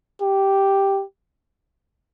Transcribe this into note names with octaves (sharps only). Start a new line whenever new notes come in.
G4